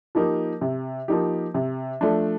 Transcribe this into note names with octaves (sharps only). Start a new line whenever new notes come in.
F3 A#3 D#4 G4
C3
F3 A#3 D#4 G4
C3
F3 A3 D4